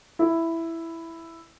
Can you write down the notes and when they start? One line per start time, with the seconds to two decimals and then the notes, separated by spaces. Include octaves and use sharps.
0.19 E4